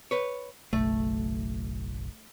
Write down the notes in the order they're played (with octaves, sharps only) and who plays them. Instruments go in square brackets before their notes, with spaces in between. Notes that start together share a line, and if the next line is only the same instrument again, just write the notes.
[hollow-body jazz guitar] B4 C#5
[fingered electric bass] F#1 B1 [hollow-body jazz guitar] A3